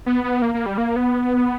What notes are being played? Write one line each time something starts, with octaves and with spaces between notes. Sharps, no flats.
B3
B3
A#3
A#3
G3
A#3
B3